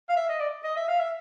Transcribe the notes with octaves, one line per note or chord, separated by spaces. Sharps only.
F5
E5
D#5
D5
D#5
E5
F5
E5